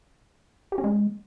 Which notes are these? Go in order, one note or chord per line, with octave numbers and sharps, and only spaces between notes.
G4
C#4
G#3